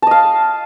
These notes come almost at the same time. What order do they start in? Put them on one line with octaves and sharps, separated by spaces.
A5 D#5 F5